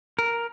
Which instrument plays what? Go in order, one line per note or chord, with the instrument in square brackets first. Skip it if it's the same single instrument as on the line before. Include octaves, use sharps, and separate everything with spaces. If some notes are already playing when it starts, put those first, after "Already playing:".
[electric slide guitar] A#4